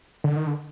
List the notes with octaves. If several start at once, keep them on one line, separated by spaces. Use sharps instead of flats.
D3
D#3
D3